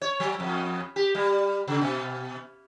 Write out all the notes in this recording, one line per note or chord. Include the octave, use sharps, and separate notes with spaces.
C#5
F#3
F2
G4
G3
C#3
B2